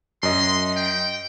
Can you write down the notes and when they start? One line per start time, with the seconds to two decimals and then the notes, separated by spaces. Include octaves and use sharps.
0.23 F#2 D#5 C6
0.76 G5